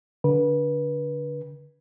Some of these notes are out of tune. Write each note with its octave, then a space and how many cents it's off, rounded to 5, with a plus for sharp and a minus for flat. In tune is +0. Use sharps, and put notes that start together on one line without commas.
D3 -20 B4 -30